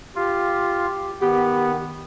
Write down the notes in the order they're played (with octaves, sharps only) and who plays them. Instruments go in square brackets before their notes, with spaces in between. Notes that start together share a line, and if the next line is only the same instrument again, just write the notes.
[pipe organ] F4 [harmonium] G4
[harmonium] D#3 [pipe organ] B3 [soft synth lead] G4